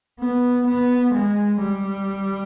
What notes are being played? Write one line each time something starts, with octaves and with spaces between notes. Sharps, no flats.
B3
B3
G#3
G3